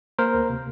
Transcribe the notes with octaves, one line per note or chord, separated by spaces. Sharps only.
A#3 A#4 C5
D2
C3